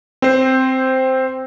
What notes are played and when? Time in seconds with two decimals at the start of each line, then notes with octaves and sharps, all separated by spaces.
0.22 C4 C5